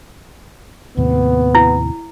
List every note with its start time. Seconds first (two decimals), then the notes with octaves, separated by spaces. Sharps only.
0.97 D#2 A2 C3 B3
1.55 E4